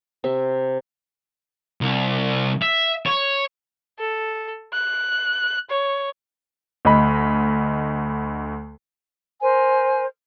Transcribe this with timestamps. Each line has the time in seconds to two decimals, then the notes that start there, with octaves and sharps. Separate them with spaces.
0.24 C3 E5
1.81 C2
2.62 E5
3.06 C#5
3.99 A4
4.73 F#6
5.70 C#5
6.85 D2 D#5 B5
9.40 A#4 C5 G#5